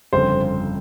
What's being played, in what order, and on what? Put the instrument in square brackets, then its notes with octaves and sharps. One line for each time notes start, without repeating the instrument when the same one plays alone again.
[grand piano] G1 F2 C#3 [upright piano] C5